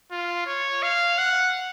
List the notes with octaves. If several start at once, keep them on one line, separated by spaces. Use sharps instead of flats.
F4
C#5
F5
F#5